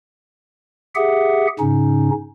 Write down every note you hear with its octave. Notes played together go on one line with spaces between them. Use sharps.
G4 G#4 E5 F#5
G#2 C#3 C#4 D#4